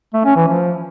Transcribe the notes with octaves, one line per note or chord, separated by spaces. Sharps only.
A3
C#4
E3
F3